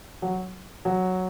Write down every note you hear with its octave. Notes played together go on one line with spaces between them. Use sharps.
F#3
F#3